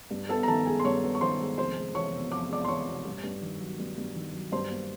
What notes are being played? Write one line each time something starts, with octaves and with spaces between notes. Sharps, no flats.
G2
B3 A4 A5
A#5
D#3 A4 A5
G#3 G#4 G#5
C6
G2 C#5 C#6
B3
C#6
D#3 C5 C6
G#3
F1 C5 C6
G#3
E2 C#5 C#6
B2
F1 D6
G#3 D5 D6
C6
E2 C#5 C#6
B2
G2
G2
D#3
F#3
G2
G2
D#3
F#3
G2 C5 C6
A#3